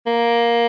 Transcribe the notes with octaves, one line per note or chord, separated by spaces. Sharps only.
A#3